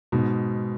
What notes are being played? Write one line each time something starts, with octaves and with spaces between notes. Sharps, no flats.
G#2 B2